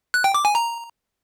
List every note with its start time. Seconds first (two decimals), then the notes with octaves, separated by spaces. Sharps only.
0.14 F#6
0.24 G5
0.34 D6
0.45 G#5
0.55 A#5